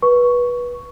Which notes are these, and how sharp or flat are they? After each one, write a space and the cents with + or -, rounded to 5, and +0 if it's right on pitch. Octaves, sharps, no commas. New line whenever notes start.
B4 -20 C#6 +5